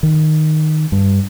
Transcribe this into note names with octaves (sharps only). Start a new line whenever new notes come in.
D#3
G2